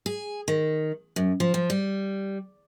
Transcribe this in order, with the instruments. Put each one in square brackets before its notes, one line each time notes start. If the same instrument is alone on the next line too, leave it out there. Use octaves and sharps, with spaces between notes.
[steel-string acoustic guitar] G#4
D#3
F#2
F3
F3
G3